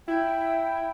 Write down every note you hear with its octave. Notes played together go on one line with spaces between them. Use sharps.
E4 G5